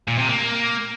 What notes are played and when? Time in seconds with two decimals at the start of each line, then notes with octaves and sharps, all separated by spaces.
0.08 A#2
0.18 C3
0.29 A#3